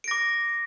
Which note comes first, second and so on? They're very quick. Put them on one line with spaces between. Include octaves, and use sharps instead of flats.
D7 A#6 D6